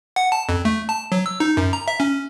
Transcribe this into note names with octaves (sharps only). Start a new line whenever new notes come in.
F#5
A5
F2
A3
A5
F#3
E6
D#4
F#2
A#5
E5
C#4